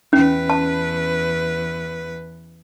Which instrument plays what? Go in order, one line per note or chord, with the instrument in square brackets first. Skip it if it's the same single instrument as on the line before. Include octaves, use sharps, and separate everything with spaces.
[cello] E2 B4 [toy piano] C#4
[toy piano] A5